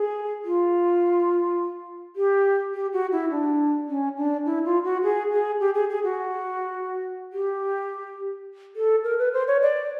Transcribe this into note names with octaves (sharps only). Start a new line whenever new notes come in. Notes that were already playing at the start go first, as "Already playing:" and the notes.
Already playing: G#4
F4
G4
G4
F#4
E4
D4
C#4
D4
E4
F4
F#4
G#4
G#4
G4
G#4
G#4
F#4
G4
A4
A#4
B4
C5
C#5
D5